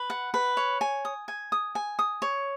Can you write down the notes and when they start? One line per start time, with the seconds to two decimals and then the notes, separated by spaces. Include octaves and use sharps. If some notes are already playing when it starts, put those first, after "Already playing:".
Already playing: B4
0.10 F#5
0.34 B4
0.57 C#5
0.81 G#5
1.05 D#6
1.28 G#5
1.52 D#6
1.75 G#5
1.99 D#6
2.22 C#5